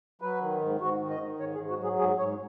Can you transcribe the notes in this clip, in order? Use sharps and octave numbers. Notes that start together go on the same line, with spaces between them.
F#3 B4
D#3
G#2
G#2 F#4
D#3
D#5
D#3
G#2 C#5
G#4
G#2
F#4
F#3
G#4
G#2 G#4
G#2 C#5